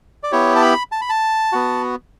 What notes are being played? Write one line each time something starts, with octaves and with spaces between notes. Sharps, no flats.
D5
B3 E4 G4 C#5
A5
B5
A5
B5
A5
B3 F#4